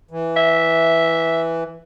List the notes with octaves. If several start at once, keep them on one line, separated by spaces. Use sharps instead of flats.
E3
E5